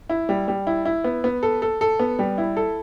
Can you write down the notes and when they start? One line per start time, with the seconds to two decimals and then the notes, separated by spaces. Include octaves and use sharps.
0.09 E4
0.29 G3
0.48 G3
0.67 E4
0.85 E4
1.04 B3
1.24 B3
1.43 A4
1.62 A4
1.81 A4
1.99 B3
2.19 G3
2.38 E4
2.57 A4